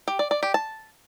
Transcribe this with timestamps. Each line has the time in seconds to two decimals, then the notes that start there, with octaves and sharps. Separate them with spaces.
0.08 G4
0.19 D5
0.31 D5
0.43 G4
0.54 A5